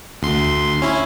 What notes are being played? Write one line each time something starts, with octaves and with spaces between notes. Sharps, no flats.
D2 C6
C#4 E4